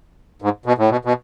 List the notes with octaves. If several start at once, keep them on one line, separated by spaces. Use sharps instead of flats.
G#2
B2
A2
B2
B2